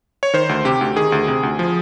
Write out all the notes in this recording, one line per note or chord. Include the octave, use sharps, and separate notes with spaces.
C#5
D#3 C5
D2
C3 G4
D2
D#3 G#4
D2
C3
D2
F3